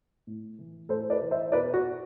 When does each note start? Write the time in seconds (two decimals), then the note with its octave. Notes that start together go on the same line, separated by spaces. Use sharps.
0.27 A2
0.59 E3
0.89 A2 A4 C5
1.10 B4 D5
1.22 E3
1.31 C5 E5
1.52 B2 B4 D5
1.74 F#4